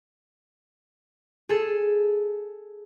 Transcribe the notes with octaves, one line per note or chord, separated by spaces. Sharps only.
G#4 A4